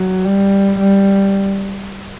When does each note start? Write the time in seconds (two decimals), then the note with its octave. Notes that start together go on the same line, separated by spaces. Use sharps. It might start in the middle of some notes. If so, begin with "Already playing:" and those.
Already playing: F#3
0.25 G3
0.79 G3